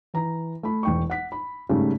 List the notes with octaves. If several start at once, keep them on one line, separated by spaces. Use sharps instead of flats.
E3 A#5
A3 B5
E1 G5 C#6
F#5 B6
B5
G#2 C#3 G3 A3